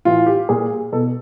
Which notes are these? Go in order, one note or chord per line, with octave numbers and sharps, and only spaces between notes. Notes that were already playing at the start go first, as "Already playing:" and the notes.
A2 E3 F4
G4
A#2 G#4
B2 A4